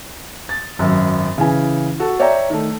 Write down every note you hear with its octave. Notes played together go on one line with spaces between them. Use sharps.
A6
G#1 F#2
C#3 E3 G#5
F#4 A4
C#5 D5 E5 G5 A#5
D#3 A3